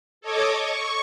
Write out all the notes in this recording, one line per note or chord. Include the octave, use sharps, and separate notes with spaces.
A4 C#5 D#5 D6 G#6
C#6